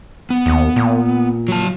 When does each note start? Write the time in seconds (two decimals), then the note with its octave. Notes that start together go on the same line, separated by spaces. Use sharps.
0.30 B3
0.46 D#2
0.76 A#2
1.48 F#3 A5